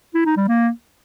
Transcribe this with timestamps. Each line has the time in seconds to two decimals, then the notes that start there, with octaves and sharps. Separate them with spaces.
0.14 E4
0.26 D#4
0.37 G3
0.48 A#3